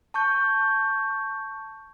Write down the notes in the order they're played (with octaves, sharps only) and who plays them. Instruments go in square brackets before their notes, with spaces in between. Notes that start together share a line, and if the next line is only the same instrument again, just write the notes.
[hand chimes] A5 C#6 G6